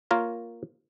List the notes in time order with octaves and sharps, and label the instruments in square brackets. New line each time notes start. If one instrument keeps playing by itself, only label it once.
[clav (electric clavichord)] A#3 F4 A#4 C#5